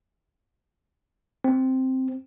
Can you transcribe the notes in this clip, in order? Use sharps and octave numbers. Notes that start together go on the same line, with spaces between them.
C4